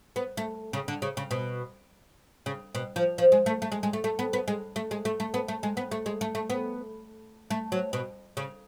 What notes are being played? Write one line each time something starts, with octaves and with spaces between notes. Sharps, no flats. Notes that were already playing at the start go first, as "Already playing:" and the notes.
B3
A3
C#3
D3
C#3
C#3
B2
C#3
B2
F3
F3
G#3
A3
A3
G#3
G#3
A3
A3
B3
B3
G#3
A3
G#3
A3
A3
B3
A3
G#3
B3
A3
G#3
A3
A3
B3
A3
F#3
B2
C#3